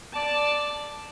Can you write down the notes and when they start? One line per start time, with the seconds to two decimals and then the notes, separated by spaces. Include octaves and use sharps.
0.13 D5 A5